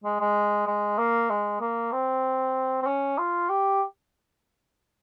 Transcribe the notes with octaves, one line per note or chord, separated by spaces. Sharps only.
G#3
G#3
G#3
A#3
G#3
A#3
C4
C4
C#4
F4
G4